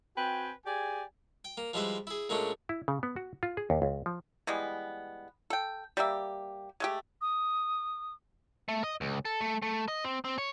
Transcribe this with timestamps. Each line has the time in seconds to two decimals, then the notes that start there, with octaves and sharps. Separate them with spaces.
0.17 C4 F#4 B4 G5 G#5
0.66 G4 G#4 D5 G#5
1.45 G5
1.57 A#3
1.74 F3 G3 G#3 E4 B4 C5
2.07 E4 G#4
2.29 A#2 G#3 A3 C#4 D4
2.69 E4
2.88 C#3
3.03 B3
3.16 F#4
3.43 F4
3.57 G#4
3.70 D#2
3.82 C#2
4.06 F3
4.47 E3 G3 G#3 B3
5.50 A4 G5
5.97 G3 A#3 G4 E5
6.80 G#3 A3 G4
7.21 D#6
8.69 A3
8.84 D#5
9.01 C#2
9.25 A4
9.41 A3
9.62 A3
9.88 D#5
10.04 C4
10.25 C4
10.38 C#5